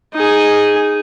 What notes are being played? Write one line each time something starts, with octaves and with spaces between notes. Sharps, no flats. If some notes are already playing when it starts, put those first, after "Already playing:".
D#4 G#4